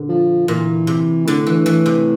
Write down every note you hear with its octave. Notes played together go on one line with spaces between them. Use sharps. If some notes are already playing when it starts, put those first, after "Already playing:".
Already playing: A#2 D3
F3
A#2 E3
C3
A2 D3
E3
E3
C3